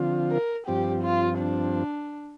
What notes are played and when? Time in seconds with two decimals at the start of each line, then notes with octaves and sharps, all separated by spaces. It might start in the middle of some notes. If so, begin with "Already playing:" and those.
Already playing: D3 F3 C4 F4
0.31 A#4
0.67 G2 F3 C4 G4
1.03 F4
1.39 D4